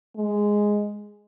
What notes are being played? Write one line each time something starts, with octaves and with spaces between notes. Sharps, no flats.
G#3